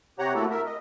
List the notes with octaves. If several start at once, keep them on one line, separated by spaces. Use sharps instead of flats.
C3 G4 C#5 F#5 A#5
A3 A#3 E4 F#4 A4
A#4 E5
D#5